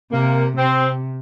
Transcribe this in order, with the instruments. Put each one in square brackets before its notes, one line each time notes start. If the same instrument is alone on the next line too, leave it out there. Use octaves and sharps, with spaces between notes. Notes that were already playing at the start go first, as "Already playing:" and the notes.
[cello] C3 [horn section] A#3
[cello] C3 [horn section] C4